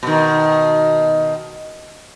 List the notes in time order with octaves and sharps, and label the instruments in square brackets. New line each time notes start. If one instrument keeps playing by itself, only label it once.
[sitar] B2 D#3